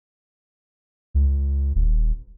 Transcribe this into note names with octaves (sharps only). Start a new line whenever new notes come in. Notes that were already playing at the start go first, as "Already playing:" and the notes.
C#2
D#1